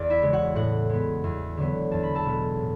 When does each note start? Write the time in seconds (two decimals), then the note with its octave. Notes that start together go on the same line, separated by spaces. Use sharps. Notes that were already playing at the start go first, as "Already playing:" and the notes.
Already playing: E2 D5
0.10 E4 E5
0.22 C#3 G#3 B3
0.33 F#4 F#5
0.55 A2 F#4 F#5
0.89 G#3 B3
1.24 E2
1.57 D3 F#3 B3
1.91 E2 A5
2.03 B5
2.15 A4 A5
2.25 B2 G#3 B3
2.60 A2